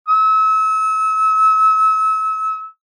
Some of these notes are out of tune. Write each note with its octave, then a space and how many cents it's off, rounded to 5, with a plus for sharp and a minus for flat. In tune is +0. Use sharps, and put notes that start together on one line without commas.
E6 -35